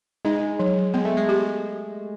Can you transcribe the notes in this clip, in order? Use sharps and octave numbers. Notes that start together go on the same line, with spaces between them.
G#3 D#4
F#3
G#3 B3
A3
G#3
G4